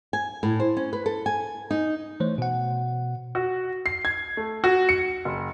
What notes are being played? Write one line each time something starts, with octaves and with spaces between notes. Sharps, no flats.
G#5
A2
C5
C#4
B4
A4
G#5
D#4
E3 A3 C5 C#5
B2 F#5
F#4
C7
G#6
A3
F#4
C#7
F#1